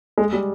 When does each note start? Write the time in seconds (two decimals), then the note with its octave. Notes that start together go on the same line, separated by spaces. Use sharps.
0.18 G#3
0.33 G3